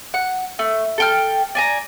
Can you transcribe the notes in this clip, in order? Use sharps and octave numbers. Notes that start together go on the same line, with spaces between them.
F#5
A3
A4 G5 F6
D5 G#5 A#5